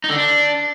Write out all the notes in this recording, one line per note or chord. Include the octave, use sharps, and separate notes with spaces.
D#4
D3
D4